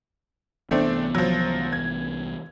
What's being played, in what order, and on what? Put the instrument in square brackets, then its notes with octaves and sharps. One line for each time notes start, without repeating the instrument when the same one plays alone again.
[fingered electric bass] C2 E3 B3 [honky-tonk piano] A3 C4 D4
[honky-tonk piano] F3 F#3
G#6